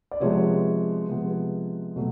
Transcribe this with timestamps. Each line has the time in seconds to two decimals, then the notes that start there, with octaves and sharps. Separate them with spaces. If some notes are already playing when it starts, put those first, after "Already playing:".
0.11 D5
0.20 C3 F3 G#3 B3 C#5
1.08 C3 F3 G#3 B3
1.96 B2 F#3 A3